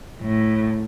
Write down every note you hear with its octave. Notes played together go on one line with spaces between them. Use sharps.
A2